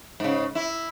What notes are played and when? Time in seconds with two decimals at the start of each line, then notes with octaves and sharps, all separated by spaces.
0.20 G#2 C#3
0.55 E4